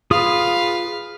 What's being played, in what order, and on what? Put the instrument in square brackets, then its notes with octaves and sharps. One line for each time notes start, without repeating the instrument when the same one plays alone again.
[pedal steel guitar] F4 G#4 D#6 [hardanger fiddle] B4 F5